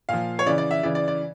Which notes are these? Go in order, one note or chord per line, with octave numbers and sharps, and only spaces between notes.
A#2 F3 F5
C#5
C#3 E3 D5
D5
E5
C#3 E3 D5
D5
D5